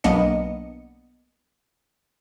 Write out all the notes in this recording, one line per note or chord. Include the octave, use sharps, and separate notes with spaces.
B1 A#3 B3 D4 D#5 C#7